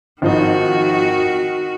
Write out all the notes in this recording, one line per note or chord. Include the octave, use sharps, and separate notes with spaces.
G#1 D#3 F3 D#4 F#4